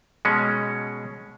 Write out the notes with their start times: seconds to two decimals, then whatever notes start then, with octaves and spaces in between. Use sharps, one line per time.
0.25 B2 G#3 C#4